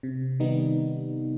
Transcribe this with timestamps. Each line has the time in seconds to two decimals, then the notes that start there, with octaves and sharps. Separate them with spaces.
0.03 C3
0.40 D#3 G3 B3 D#4